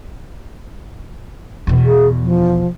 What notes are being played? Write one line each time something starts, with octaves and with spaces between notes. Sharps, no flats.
E2 B2
G#4
F3